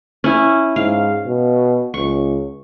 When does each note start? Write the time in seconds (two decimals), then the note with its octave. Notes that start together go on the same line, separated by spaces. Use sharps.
0.24 C#4 E4
0.76 G#2 F5
1.26 B2
1.94 C#2 C#6